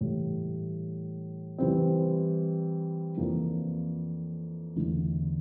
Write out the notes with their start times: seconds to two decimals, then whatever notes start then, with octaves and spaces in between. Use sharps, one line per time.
0.01 A2 E3 G3
1.58 E3 G3 C4
3.17 F2 E3 A#3 D4
4.76 E2 D3 A3 E4